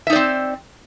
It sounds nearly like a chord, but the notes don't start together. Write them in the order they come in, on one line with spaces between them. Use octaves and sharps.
E5 D#4 D5 C4